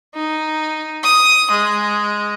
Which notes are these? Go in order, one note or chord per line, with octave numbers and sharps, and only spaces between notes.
D#4
D#6
G#3